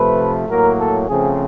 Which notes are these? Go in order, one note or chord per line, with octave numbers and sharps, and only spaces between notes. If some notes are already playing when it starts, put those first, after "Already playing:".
Already playing: C3 F3 A3 B4
A2 F#3 A#3 A#4
A4
C#3 F3 A3 C4 G#4